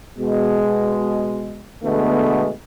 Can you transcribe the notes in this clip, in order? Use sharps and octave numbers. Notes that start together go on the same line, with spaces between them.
B2 G#3
B2 D3 G#3 A3 B3